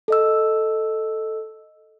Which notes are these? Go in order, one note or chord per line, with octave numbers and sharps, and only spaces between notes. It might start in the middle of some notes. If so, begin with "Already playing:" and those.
A4 D#5 E6